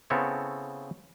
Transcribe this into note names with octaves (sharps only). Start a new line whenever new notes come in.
C#3 B3 C4 E4 A4 C#5